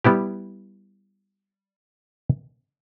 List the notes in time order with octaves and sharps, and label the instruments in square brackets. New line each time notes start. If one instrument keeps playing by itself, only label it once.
[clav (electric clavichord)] G3 B3 E4 G4